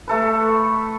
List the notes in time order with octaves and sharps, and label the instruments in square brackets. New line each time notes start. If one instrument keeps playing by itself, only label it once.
[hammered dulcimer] A3 A4 B4